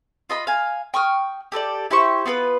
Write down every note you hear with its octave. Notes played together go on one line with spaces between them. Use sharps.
F4 D#5 B5
F5 G#5
G5 C#6 D#6 F6
G4 A4 A#4 D5
E4 G4 C5 C#6
B3 F4 A4 B4